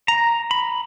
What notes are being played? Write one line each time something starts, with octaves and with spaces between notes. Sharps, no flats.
A#5
B5